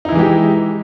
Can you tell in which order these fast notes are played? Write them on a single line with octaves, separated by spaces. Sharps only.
D#4 E4 E3 G#3 G4